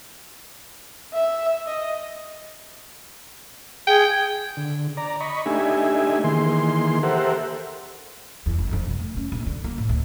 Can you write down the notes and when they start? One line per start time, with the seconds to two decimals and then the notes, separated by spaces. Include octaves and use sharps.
1.13 E5
1.67 D#5
3.87 G#4 G5
4.57 D3
4.97 D5 A#5
5.20 D#5 B5 C#6
5.46 A3 D4 D#4 G4 E5 G#5
6.24 D#3 E3 A#3 G#4 C6
7.03 G4 A4 A#4 C5 E5 F#5
8.46 E2
8.59 G1
8.73 F2
8.85 B2
8.99 A3
9.17 C#4
9.32 A#1
9.46 D3
9.64 A#3
9.78 A2
9.89 D2